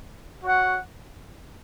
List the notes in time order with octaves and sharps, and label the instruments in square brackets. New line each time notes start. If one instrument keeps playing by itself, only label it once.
[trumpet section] F#4 C#5 F#5